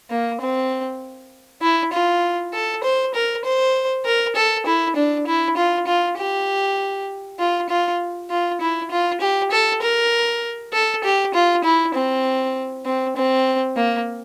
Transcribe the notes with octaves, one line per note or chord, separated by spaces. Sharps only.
A#3
C4
E4
F4
A4
C5
A#4
C5
A#4
A4
E4
D4
E4
F4
F4
G4
F4
F4
F4
E4
F4
G4
A4
A#4
A4
G4
F4
E4
C4
C4
C4
A#3